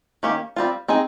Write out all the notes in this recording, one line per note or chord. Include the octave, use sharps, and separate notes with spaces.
D#3 A#3 C#4 G4
G3 C4 F4
C4 D#4 G#4 D#5